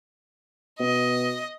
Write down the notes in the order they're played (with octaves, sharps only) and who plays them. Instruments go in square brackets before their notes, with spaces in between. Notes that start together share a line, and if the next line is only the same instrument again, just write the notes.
[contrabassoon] B2 [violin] D#5